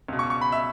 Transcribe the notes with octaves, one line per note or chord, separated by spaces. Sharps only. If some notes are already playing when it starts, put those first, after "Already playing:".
C#2 B2
C#6
C#6
B5
E5